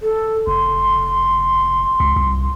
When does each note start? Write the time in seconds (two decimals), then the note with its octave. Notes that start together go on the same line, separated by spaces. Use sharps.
0.01 A4
0.47 F1 C6
2.00 C#2
2.16 C2